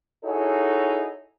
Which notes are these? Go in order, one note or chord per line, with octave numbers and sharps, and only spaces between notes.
D#4 E4 F#4 G#4 A4 C#5